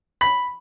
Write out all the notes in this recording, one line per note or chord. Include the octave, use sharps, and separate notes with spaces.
B5